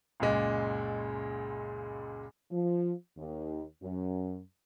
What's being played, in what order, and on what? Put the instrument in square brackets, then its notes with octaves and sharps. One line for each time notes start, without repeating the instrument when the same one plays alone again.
[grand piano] C#2 F#2 A#2 G#3
[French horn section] F3
D#2
F#2